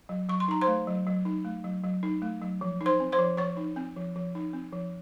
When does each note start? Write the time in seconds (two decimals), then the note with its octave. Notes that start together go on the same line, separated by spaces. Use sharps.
0.09 F#3
0.29 F#3 C#6
0.40 C6
0.48 D#4 A#5
0.61 C5 C6
0.67 A3
0.87 F#3
1.07 F#3
1.25 D#4
1.45 A3
1.64 F#3
1.84 F#3
2.03 D#4
2.22 A3
2.42 F#3
2.61 F3
2.81 D#4
2.86 C5 C6
3.00 C4
3.12 C5 C6
3.19 F3
3.37 F3 C#5 C#6
3.57 D#4
3.76 C4
3.96 F3
4.16 F3
4.35 D#4
4.53 C4
4.73 F3